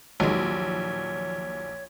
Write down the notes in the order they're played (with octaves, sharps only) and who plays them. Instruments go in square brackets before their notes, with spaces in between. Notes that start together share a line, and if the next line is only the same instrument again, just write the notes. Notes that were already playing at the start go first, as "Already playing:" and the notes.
[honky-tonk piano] A#1 [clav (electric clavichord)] D#2 F#3 [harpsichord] D#3 G#3 [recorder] C#5